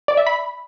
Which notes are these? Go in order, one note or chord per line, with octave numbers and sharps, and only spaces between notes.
D5
E5
B5